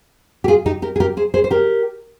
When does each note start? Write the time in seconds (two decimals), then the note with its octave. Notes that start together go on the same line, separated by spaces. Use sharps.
0.44 G4
0.48 F4 G#4
0.66 D#4 G4
0.82 G4 A#4
0.96 G#4
1.00 G4 A#4
1.17 G#4 C5
1.34 G#4 C5
1.44 C5
1.51 G4 A#4